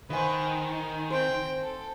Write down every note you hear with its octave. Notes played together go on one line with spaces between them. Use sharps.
D#3 B4 C5 F5 F#5 G#5
D#4
C4 C5 G5
A4